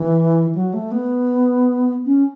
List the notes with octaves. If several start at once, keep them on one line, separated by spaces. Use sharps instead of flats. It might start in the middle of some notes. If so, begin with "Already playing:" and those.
Already playing: E3
F#3
A3
B3
C#4